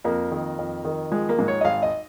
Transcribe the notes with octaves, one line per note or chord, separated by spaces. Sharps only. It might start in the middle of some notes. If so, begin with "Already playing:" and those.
F2 A#3
D#3
F2
D#3
F3 G#3
A#3
G#2
C#5
D#5
G#1 F5
D#5